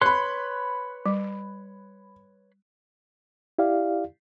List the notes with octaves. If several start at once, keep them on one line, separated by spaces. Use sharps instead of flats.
B4 C#5 B5 C6 F#6
G3
E4 G4 D5 F5